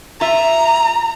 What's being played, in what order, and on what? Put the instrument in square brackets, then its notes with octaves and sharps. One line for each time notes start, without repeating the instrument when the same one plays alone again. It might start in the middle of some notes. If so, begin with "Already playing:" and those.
[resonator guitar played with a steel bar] F4 E5 [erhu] A#5